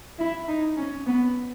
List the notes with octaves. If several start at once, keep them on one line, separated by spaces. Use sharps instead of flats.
E4
D#4
C#4
B3